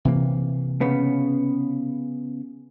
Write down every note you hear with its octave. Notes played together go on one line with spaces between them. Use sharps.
C3 E3 A#3
C#3 B3